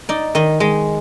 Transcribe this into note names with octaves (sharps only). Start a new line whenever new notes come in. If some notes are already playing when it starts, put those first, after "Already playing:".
D#4 D5
D#3 D#5
G#3 D#5